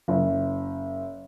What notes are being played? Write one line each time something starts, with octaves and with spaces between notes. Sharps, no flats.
F#1